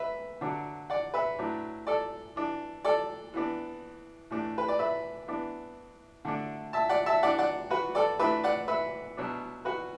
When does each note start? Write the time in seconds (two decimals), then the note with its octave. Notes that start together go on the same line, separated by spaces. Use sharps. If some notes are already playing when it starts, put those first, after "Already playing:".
Already playing: B4 E5
0.41 D3 F#3 D4
0.90 D5 F#5
1.14 B4 E5
1.39 A2 F#3 D4
1.87 A4 D5
2.36 E3 D4
2.85 A4 D5
3.34 E3 B3 D4
4.30 A2 E3 A3 D4
4.58 B4
4.68 D5
4.79 B4 E5
5.28 E3 B3 D4
6.25 D3 A3 D4
6.73 E5 A5
6.89 D5 F#5
7.06 E5 A5
7.23 E3 D4 D5 F#5
7.38 D5 F#5
7.70 F#4 B4
7.95 A4 D5
8.19 E3 A3 D4 B4 E5
8.44 D5 F#5
8.68 B4 E5
9.17 B2 F#3 D4
9.65 F#4 B4